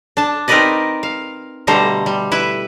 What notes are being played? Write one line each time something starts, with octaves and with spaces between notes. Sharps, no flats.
D4 A5
C4 D#4 A#4 B4 D5 D#5
F5
B2 D3 G3 A3 C5 A#5
G3
E4 B4 E5